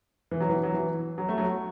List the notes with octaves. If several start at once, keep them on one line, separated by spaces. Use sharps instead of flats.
E3
F#3
E3
F#3
E3
F#3
A3
F#3